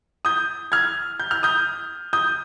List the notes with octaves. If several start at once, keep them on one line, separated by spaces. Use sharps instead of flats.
D#6 G6
F6 G#6
G6
F6
D#6 G6
D#6 G6